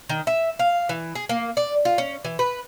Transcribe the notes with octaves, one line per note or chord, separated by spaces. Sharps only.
D#3
E5
F5
E3
G#4
A#3
D5
F4
C#4
E3
B4